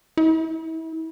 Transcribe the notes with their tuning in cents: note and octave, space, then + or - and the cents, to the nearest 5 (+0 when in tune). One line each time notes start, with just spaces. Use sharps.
E4 -35